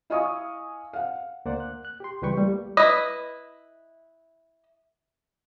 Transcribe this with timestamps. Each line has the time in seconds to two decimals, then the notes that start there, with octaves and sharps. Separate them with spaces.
0.10 E4 D#5 F5 G#5 C#6 D#6
0.93 F5 F#5
1.45 D2 A#3 C5 D5 F#5
1.60 F#6
1.85 F#6
2.00 G4 C6
2.22 C#2 E3 G3 B4 G5 C#6
2.37 G3 A3 A#3
2.77 E4 B4 D#5